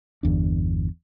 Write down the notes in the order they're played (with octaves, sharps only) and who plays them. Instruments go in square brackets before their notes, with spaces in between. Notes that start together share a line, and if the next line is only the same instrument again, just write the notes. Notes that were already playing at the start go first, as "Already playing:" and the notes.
[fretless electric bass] G1 E2 D4